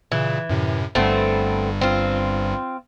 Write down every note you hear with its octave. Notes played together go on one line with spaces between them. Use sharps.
A#2 C#3 E3
F#2 A2 C3
G1 G2 G3 A3 B3 C4
C4 F4